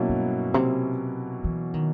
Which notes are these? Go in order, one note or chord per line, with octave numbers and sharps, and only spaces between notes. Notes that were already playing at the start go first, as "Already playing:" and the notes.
Already playing: B2 F#3 A#3 C#4 E4
G2
C3
E3
D#3